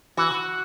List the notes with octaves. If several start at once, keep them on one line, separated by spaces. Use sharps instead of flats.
E3 F#4